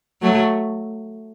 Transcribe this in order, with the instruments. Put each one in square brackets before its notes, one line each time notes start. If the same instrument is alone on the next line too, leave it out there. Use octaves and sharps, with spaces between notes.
[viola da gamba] F#3 A3